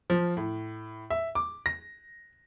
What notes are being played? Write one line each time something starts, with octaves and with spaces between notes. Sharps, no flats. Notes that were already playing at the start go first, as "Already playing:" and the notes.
F3
A2
E5
D6
A#6